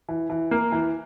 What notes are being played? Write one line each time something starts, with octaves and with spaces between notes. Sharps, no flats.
E3
E3
A#3
E3